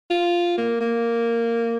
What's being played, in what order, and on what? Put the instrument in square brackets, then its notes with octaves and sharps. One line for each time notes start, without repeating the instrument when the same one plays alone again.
[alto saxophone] F4
A#3
A#3